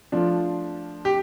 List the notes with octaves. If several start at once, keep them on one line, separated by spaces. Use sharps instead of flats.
F3 A3 D4 F4
G4